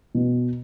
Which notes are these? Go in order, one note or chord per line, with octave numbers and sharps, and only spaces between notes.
B2